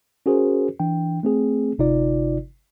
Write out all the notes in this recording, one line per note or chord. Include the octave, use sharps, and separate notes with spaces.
C#4 F#4 G#4 A#4 C5
E3 D4 G5
A3 C4 G#4
G1 C3 D#4 F4 D5